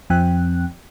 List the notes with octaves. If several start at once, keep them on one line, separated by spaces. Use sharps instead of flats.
F2 F3 C4 G5 F#6